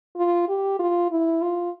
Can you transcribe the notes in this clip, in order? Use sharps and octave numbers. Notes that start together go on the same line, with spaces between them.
F4
G4
F4
E4
F4